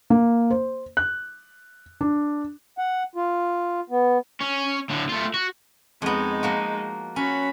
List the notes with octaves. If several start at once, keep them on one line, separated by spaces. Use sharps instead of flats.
A#3
C5
F#6
D4
F#5
F4
B3
C#4
A2 D3
A3 F4
F#4
F2 G#3 B3 D#4
F3 A#3 F#4
C#4 F#4 B5